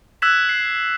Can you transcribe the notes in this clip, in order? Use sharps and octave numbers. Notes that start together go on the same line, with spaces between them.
E6 F#6 G#6 B6 E7
C7